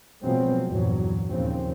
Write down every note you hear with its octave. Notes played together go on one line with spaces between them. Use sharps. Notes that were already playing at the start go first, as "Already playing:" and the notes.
B2 F3 F#3 G#3 B3 C4
E2 G2 A#2 F#3
D#2 A#2 C#3 F3 C4